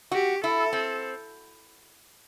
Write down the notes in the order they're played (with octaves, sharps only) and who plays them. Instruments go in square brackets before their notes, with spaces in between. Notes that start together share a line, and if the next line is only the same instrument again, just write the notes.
[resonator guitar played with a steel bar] F#4 [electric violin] G4
[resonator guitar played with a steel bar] E4 [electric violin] A4
[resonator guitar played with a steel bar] C4